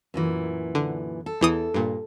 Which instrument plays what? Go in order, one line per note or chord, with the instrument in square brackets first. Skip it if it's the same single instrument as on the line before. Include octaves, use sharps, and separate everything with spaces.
[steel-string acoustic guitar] F#2 A#2 E3
[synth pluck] D3
[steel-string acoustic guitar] A4
[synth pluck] E2 E3 D#6
G2 A#2